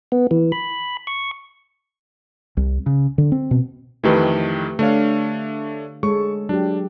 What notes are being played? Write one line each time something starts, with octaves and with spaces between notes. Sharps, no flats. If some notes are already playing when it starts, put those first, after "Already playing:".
B3
E3
B5
C#6
C2
C#3
D3
C4
B2
F2 D#3 E3 A3 G4 B4
D3 A3 D4 C#5 F5
G#3 A4 C#5 C#6
F#3 D4 G4